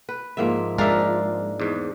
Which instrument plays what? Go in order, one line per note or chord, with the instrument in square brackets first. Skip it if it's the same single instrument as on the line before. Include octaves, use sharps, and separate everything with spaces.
[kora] B4
[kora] G#2 A#3 E5 [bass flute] F3
[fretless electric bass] G#3 [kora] D4 F5 [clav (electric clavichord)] A#4 E5
[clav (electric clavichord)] E2 G#2